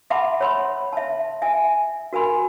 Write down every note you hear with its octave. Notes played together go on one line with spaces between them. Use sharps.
E5 F#5 A5 B5 C6 D6
C#5 B5 C6
E5 A5
E5 G5 G#5
F#4 A#4 G#5 B5 C6